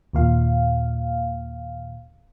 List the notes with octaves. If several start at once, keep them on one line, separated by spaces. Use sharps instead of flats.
D#2 A#2 F5